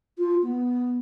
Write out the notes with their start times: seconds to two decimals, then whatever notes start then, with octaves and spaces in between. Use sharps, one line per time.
0.18 F4
0.42 B3